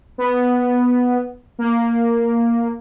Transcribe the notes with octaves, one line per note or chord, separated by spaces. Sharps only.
B3
A#3